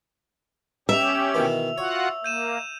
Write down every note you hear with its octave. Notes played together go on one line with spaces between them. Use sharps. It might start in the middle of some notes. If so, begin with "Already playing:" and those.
C#4 G4 E5 E6 F7
B2 D#3 E3
F4 F#4 C#5 F#5
A#3 G6 D#7 E7